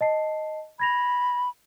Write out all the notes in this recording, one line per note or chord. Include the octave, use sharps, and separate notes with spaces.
D#5 A5 C7
B5 G#6 A#6 F7